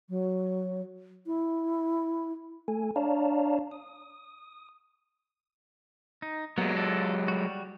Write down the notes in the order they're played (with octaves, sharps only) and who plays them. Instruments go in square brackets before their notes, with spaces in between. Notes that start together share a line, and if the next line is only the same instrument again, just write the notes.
[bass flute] F#3
E4
[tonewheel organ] A3 A4 G#5
D4 C#5 D5 F5 A5 A#5
D#6
[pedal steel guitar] D#4
[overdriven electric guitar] F#3 G#3 [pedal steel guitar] A#3 B3
[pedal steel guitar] F4 A4 D5
G3 F#4